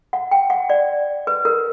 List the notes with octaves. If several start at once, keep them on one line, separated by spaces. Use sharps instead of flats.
F#5
G5
F#5
D5
B4
A#4